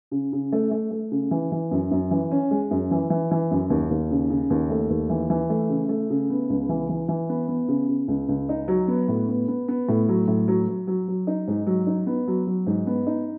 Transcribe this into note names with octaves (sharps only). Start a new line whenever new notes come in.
C#3
C#3
A3
A3
A3
C#3
E3
E3
F#2
F#2
E3
C#4
G#3
F#2
E3
E3
E3
F#2
D#2
D#2
C#3
C#3
D#2
A3
D#2
E3
E3
A3
C#3
A3
C#3
B3
C#2
E3
E3
E3
B3
B3
C#3
C#3
C#2
C#2
D#4
F#3
B3
A2
B3
B3
B3
A2
F#3
A2
F#3
F#3
F#3
F#3
D#4
G#2
F#3
D#4
B3
F#3
F#3
G#2
B3
D#4